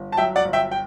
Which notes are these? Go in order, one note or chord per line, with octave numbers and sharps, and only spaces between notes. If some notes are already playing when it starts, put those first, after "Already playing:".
Already playing: G1
A5
F#3 E5 G5
D5 F#5
G1
E5 G5
G5